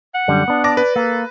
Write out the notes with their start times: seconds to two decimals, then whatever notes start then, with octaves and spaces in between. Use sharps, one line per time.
0.14 F#5
0.28 F#2 D3 G3
0.48 B3 D4
0.64 D5 A5 D6 A#6
0.77 B4
0.96 A#3 A4